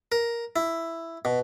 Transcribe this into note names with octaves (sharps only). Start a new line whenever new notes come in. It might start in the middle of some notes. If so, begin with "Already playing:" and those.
A#4
E4
B2